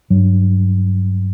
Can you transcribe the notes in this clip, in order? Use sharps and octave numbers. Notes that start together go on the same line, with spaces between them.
G2 F#3